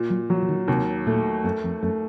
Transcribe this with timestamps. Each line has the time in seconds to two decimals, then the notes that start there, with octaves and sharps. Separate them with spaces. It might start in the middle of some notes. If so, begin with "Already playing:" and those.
Already playing: A#2
0.10 F#3
0.30 F3 F#3
0.42 F3
0.49 D#3
0.68 D#2 C3
1.06 A#2 A3
1.44 F#2 A3
1.64 F2
1.82 F#2 A3